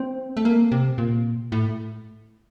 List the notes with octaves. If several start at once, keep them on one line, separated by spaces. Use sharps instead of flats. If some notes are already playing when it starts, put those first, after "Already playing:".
Already playing: C4
A3
A#3
C3
A#2
A2